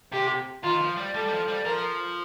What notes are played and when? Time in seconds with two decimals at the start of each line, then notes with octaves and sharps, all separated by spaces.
0.12 C3 G4
0.63 D#3 F4
0.81 F3
0.97 G3
1.14 G3 A4
1.26 G3
1.31 F3
1.48 G3
1.65 F3 A#4